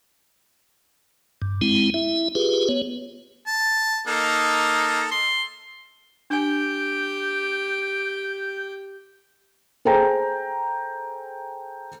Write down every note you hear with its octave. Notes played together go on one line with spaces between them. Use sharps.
G2
G#3 C4 E4
E4 E5
F4 G4 G#4 B4
B3 C#5
A5
A#3 D#4 A4
C6
D4 G4 G5 G#5 G6
G#4 A4 C5 G5 A#5